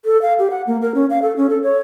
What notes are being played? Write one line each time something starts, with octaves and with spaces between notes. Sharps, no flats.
A4
F5
G4
F#5
A#3
A#4
C#4
F5
A4
C#4
A4
C#5